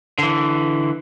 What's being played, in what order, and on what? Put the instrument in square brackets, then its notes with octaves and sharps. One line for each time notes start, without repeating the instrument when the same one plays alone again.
[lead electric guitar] D3 E3